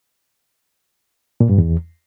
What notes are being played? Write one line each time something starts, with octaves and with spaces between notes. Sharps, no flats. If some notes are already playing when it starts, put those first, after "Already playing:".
A#2
G2
E2